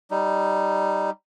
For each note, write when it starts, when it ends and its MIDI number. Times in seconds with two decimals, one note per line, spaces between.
0.11 1.10 55
0.11 1.10 63